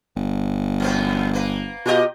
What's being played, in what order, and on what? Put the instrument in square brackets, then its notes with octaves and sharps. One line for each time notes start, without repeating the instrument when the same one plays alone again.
[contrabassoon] G1
[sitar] F2 B3 C4
A#3 B4
[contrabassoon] B2 [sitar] F4 G4 D#5